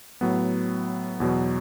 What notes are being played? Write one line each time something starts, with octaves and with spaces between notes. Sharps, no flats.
A2 F#3 B3
E2 B2 F#3 B3